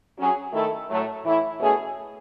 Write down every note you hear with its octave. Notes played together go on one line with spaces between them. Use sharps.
F#3 C#4 G#4
D#3 A3 E4 A4
A2 F#3 A3
A2 E3 A3 E4
B2 A3 C#4 G#4